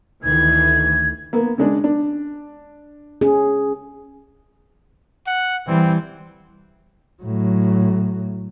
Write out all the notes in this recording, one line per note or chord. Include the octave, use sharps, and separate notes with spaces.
D2 D#3 E3 G#6
A#3 B3
C#3 G#3 D4
D4
C#4 G#4
F#5
E3 G3 C4
A2 F#3